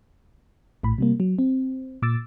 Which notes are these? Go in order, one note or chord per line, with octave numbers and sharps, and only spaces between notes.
A#1 A2 B5
C3 G3 A#3
F#3
C4
A#2 D6 E6 A6